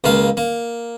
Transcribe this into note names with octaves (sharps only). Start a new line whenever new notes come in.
C#2 A#3 F5
A#3